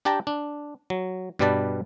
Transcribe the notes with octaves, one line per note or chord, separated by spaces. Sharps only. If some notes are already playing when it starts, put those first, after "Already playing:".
D4 G4 G5 A5 A#5
D4
F#3
G2 B2 G3 B4 D5 A5